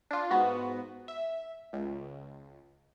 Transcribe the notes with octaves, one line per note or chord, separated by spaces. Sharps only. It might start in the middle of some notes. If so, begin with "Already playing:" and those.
D4 F4
G#2 B3 F#4
E5
C#2